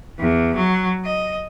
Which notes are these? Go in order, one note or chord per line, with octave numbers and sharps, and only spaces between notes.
E2
F#3
D#5